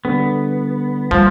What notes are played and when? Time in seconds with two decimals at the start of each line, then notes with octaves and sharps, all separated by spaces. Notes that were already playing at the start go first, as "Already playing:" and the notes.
0.05 D3 G3 B3
1.11 F3 G3 B3